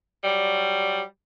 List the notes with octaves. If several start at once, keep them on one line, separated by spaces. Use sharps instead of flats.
F#3 G3